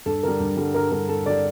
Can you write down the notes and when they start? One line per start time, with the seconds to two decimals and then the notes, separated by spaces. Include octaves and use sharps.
0.06 G2 A4
0.23 D3 G3 A#4
0.40 G2
0.57 D3 G3
0.74 G2 A#4
0.91 D3 G3 A#4
1.09 G2 A4
1.26 D3 G3 D5